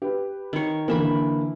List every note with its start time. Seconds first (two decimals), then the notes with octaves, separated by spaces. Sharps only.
0.02 G4 B4
0.53 D#3 C#5
0.88 D3 E3 A#3 E5 B5